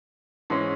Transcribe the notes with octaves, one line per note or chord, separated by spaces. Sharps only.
G#2 E3 G#3 C#4